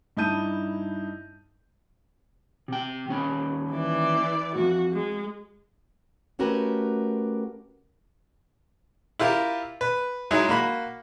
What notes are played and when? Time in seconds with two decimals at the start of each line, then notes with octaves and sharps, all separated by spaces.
0.17 G2 D#4 E4 A5 G6 D#7
2.68 C3 G5
3.09 D#2 C#4 B5
3.73 E3 D5
4.55 F2 G#2 F#4
4.93 G#3
6.39 A3 C#4 F#4 G4 A#4 B4
9.19 E4 F4 G4 A#4
9.81 B4
10.31 F#3 G#3 D#4 E4
10.49 A#3 F#4 B5